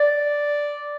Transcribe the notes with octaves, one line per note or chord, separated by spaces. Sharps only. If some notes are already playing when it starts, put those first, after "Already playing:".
Already playing: D5